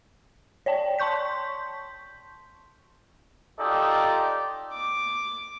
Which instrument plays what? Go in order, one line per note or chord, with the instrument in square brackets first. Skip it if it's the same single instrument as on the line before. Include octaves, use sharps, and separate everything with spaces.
[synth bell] C#5 D5 G5 A5
A5 C6 C#6 G6 B6
[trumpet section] D#4 F4 G4 A4 D5 D#5
[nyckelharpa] D6